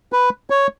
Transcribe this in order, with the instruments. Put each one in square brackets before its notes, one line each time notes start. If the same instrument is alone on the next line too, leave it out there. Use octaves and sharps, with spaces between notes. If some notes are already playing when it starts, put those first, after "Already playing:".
[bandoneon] B4
C#5